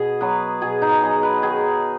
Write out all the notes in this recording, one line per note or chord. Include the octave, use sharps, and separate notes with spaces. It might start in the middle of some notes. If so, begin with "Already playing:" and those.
Already playing: B2 G#4
F#3 B3 B4
B2 G#4
D#4
F#3 B3 G#4
B4
D#3 G#4